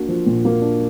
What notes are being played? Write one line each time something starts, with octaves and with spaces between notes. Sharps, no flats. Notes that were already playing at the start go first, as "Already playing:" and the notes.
Already playing: A#3 D4 F#4
F3
A#2
A#3
D4